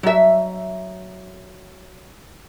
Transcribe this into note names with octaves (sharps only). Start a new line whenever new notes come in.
F#3 E5